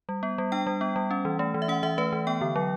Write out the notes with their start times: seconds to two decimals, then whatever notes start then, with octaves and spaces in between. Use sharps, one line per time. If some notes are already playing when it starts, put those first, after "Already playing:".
0.09 G3
0.23 B3
0.38 G3
0.52 D4 G5
0.67 G3
0.81 B3
0.96 G3
1.11 C#4
1.25 E3
1.39 A3
1.54 E3
1.62 E5
1.68 C#4 F#5
1.83 E3 E5
1.98 A3 B4
2.13 E3
2.27 B3 G5
2.41 D3
2.56 F#3